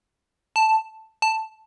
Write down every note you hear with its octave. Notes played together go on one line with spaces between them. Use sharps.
A5
A5